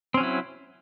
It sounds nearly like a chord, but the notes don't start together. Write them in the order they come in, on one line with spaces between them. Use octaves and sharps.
C4 C#4 F#3 E4